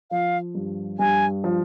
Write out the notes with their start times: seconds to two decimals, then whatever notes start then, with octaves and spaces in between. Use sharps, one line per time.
0.11 F3 F5
0.55 G2
0.99 G2 G#5
1.44 F3